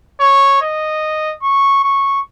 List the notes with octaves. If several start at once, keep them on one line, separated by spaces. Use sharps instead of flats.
C#5
D#5
C#6
C#6